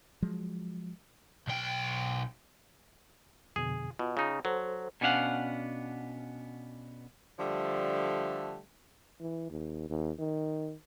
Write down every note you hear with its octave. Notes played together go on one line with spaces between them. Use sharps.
F3 F#3 G#3
B1 G5
F2 B2 D3 G#4
B2 F4
C#3 D#4
F#3 A4 C5
B2 B3 C#4 D4 F5 F#5
D3 F3 G3 A3
E3
D#2
D#2
D#3